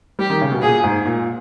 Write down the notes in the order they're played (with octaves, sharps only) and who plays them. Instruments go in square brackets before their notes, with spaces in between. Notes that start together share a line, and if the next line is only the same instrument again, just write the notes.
[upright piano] G3 [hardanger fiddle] G4
[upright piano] D#3
C#3
B2
[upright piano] A#2 [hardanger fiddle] G#4
[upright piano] G#2
A#2